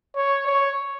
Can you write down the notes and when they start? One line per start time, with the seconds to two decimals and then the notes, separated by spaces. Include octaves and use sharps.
0.16 C#5
0.47 C#5